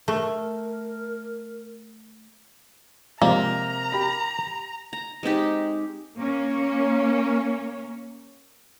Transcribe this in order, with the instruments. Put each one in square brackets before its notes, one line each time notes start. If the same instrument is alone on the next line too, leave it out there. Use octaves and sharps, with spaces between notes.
[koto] A3 [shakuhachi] A#4
[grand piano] C3 [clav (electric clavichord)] F3 G#3 D5 [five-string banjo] A#3 [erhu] A#5
[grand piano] G4 B5
[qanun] A#5
G#3 C4 D#4 G4
[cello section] A#3 C#4